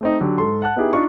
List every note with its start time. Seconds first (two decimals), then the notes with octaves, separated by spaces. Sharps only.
0.01 A3 C4 D#4
0.20 D3 F#3 G4
0.38 G#2 A4 C6
0.62 F#5 A5 F#6
0.76 B3 D#4 E4 G4 G#4
0.93 D4 D#4 F4 C#6